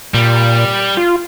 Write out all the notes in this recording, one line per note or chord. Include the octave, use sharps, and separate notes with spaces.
A#2 G3
F4